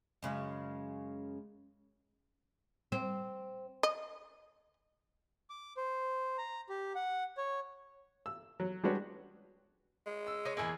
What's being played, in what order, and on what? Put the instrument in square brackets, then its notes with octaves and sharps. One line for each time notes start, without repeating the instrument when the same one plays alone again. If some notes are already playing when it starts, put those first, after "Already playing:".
[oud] F#2 C#3 G#3
C4
[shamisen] D#5
[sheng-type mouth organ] D6
C5
A#5
G4
F#5
C#5
[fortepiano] E6
F#3
G3 G#3 D4 F#4 B4 C#5
[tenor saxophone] G#3
[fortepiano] E6
[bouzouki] D#4 C#5
[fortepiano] E2 G#4 E6 [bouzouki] A#3 E4